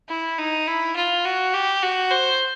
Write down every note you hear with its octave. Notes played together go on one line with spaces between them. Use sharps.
E4
D#4
E4
F4
F#4
G4
F#4
C5